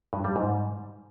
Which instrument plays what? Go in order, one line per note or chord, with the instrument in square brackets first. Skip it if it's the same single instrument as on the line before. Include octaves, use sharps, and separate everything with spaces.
[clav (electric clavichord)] G2
G3
G#2